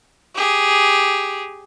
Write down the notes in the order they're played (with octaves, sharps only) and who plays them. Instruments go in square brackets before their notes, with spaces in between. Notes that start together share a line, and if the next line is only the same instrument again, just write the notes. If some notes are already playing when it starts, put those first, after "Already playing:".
[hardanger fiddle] G4 G#4